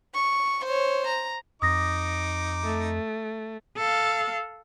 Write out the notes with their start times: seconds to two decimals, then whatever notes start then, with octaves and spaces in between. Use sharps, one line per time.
0.15 C#6
0.65 C5 C#5
1.07 A#5
1.62 F2 D#4 D6 D#6 A#6
2.64 A3
3.77 A4 F5